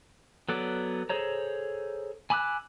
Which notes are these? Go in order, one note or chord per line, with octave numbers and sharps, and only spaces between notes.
F#3 B3 A4 D5
G#4 A4 C5 C#5 A#5
G#5 B5 D6 E6 F#6